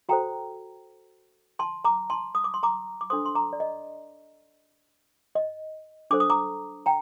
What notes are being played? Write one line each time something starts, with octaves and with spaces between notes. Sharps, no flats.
F#4 A4 C5 G5 A#5
A5 C6
A#5 D6
A5 C6
D#6
D6
C6
A#5 D6
D6
D4 A4 C5 C6 D#6
C6
A#5 D6
D5
D#5
D#5
D4 A4 C5 D6
D#6
A#5 D6
G5 A#5